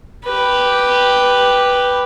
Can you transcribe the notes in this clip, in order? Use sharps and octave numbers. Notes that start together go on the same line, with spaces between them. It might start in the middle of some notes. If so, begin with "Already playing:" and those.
G4 B4